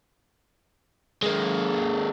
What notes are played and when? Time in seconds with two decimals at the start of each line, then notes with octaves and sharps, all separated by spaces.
1.23 G#3 A#3